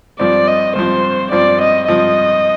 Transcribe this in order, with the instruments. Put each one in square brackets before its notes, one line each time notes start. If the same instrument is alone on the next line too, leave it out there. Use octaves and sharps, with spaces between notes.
[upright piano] G2 F3 C4 [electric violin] D5
[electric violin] D#5
[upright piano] G2 F3 C4 [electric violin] C5
[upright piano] G2 F3 C4 [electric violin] D5
[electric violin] D#5
[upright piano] G2 F3 C4 [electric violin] D#5